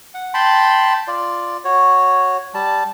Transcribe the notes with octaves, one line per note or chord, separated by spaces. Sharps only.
F#5
G5 A5 B5 C6
F4 D5
F#4 C#5
G3 A5